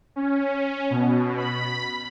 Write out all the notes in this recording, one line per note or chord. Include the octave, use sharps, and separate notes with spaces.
C#4
B2
B5